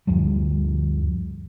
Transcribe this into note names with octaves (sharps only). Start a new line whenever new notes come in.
D2 G2 F3 G3